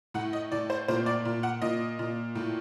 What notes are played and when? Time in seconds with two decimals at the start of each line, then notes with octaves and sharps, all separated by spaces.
0.14 A2 F#5
0.33 D#5
0.52 A2 D5
0.70 C5
0.88 A#2 C5
1.06 D5
1.25 A#2
1.43 F#5
1.62 A#2 D#5
1.99 A#2
2.35 A2